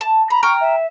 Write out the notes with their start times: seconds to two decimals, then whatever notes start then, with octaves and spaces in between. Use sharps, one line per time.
0.01 A5
0.30 A#5 B5
0.43 G5 A#5 C#6 F6
0.61 E5